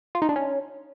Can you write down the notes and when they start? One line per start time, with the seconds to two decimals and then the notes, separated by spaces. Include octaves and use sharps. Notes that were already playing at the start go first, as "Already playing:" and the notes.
0.15 F4
0.22 D#4
0.29 D4
0.36 C#4